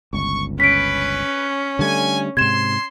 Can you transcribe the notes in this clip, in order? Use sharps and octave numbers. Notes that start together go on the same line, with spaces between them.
G1 C#2 C#6
C#4 B4 B6 D7
D3 G3 A3 G#5
G#2 C3 C6 G#6 E7